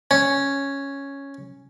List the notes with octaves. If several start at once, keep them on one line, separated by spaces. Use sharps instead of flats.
C#4